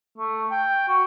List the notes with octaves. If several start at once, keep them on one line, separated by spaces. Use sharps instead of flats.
A3
G5
F#4